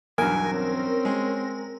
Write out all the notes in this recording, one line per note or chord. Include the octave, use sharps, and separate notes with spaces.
B1 E2 G2 A#4 G#5
C4 C#4
G#3